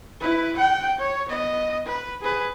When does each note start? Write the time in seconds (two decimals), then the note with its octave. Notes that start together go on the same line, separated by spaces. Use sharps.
0.20 E4 B4
0.57 F#5 G5
0.99 C#5
1.29 B3 D#5
1.87 B4
2.22 G#4 B4